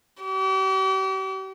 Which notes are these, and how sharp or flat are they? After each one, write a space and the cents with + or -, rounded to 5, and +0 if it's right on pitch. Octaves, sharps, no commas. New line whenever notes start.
G4 -40